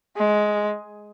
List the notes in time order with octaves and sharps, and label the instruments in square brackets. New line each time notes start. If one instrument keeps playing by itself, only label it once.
[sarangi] G#3